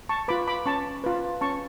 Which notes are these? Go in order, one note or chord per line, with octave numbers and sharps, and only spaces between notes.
A5 C#6
F4 B4 B5 D6
B5 D6
C#4 A5 C#6
F4 B4
C#4 A5 C#6